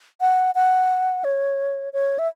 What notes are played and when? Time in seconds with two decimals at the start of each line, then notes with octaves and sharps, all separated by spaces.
0.21 F#5
0.55 F#5
1.24 C#5
1.93 C#5
2.19 E5